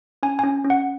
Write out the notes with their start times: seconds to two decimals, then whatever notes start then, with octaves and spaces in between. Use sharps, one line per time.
0.23 C#4 G#5
0.39 C#4 G#5
0.65 C#4
0.70 F#5